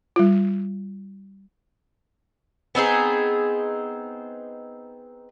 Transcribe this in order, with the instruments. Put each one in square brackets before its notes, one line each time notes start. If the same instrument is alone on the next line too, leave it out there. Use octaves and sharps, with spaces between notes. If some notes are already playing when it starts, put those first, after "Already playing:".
[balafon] G3 F4
[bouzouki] B3 C4 D#4 G#4